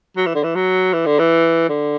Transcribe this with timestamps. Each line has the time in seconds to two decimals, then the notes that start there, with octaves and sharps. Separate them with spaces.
0.17 F#3
0.26 E3
0.35 D3
0.43 E3
0.55 F#3
0.93 E3
1.06 D3
1.19 E3
1.69 D3